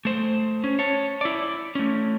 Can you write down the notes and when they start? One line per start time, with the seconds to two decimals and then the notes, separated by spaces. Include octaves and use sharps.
0.05 A3 C5
0.64 C#4
0.79 C#5 A5
1.21 E4 D5
1.75 A3 C#4